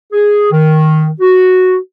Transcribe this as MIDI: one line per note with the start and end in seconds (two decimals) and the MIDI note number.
0.13 0.49 68
0.52 1.09 51
1.21 1.76 66